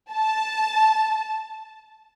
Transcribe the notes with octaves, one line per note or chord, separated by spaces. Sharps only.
A5